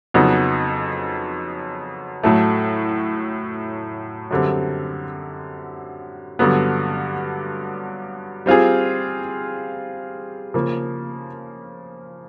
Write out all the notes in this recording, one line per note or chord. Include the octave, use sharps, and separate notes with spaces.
F2 C#3 F#3 B3 D#4
A2 F#3 A3
F#2 D3 G3 C4
G2 D3 F#3 B3
G3 C4 F4 G#4
C#3 F3 A#3